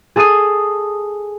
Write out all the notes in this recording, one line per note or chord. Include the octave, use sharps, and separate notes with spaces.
G#4 A4 D#6 C7 D#7